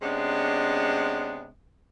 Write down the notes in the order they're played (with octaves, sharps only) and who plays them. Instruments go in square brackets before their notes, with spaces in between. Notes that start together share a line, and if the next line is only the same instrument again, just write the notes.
[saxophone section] C3 G#3 B3 C#4 D4